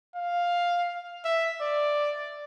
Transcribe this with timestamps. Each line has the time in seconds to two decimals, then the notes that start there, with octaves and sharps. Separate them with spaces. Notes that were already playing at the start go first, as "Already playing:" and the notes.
0.15 F5
1.25 E5
1.61 D5